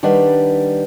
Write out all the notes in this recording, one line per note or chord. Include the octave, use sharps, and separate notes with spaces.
D#3 G3 D4 B4 F#5